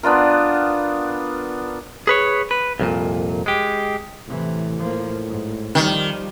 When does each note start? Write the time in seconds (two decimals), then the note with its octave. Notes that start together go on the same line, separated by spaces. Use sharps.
0.03 B3 D4 F4 A#4
2.07 G#4 B4 C#5
2.51 B4
2.79 C2 F2 A#2
3.46 G#3 G4
4.28 A2 C3 E3
4.79 F3 A#3
5.26 G#2
5.75 D#3 F3 G3